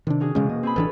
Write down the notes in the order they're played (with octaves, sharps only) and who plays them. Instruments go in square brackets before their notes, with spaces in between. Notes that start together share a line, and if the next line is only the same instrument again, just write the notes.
[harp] C3 [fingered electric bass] D#3 D4
[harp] C#4 F#4 G#4
[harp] E1 [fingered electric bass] C#3 G#3 C#4
[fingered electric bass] A#3 [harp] D#5
[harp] C4 G#4 B5
[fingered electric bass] A1 E3 D4 [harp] A4 B4 C#5